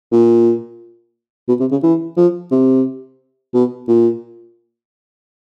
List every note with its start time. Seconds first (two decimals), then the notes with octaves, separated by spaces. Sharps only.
0.12 A#2
1.48 B2
1.60 C3
1.71 C#3
1.83 E3
2.17 F3
2.51 C3
3.54 B2
3.88 A#2